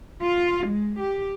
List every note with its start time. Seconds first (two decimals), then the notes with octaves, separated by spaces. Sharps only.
0.22 F4
0.67 G#3
1.00 G4